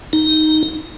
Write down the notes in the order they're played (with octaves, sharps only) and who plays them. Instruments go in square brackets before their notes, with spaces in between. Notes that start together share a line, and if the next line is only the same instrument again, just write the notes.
[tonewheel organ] D#4